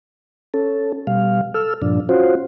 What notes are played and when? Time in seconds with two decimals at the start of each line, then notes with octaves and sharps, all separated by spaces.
0.54 C#4 A4
1.07 B2 G3 F5
1.54 A4 E6 F6
1.82 G2 A#2 F3 D4
2.09 C#4 F4 F#4 C5